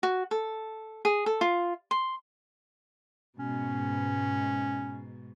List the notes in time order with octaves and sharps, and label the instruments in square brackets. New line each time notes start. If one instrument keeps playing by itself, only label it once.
[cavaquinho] F#4
A4
G#4
A4
F4
C6
[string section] G#2 B2 [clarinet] C#4